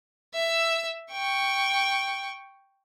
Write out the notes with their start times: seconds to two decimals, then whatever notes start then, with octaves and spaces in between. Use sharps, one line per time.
0.34 E5 E6
1.11 G5 C#6